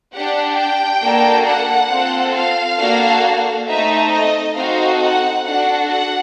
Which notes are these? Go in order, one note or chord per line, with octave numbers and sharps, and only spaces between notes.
D4 G4 F#5
G5
A#3 D4 F#4 A4
F#5
C4 F4 A4
F5
A#3 D4 F#4 A4
A3 C4 D#4 E5
D#5
C4 D#4 F#4 A4 F5
F#5
D4 F#4 A4 F#5
F#5